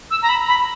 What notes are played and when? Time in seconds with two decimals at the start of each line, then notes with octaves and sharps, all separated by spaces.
0.11 E6
0.22 A#5
0.29 B5
0.48 B5